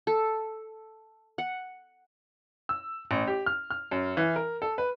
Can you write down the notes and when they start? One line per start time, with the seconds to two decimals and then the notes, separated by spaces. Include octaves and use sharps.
0.07 A4
1.38 F#5
2.69 E6
3.11 A1
3.27 G4
3.46 F6
3.70 F6
3.91 F#2
4.17 E3
4.36 A#4
4.62 A4
4.78 B4